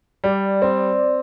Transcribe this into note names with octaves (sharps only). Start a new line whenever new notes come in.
G3 D5
C4